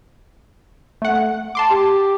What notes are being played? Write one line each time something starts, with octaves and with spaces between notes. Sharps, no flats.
A3 F#5
A5 C6 D6
G4